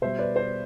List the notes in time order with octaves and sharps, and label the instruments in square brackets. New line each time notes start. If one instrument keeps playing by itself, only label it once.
[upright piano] B2 G3 C5 E5
B4 D5
C5